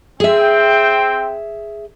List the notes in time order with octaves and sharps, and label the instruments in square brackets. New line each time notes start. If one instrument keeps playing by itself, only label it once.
[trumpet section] C4 G5 [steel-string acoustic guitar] G#4 E5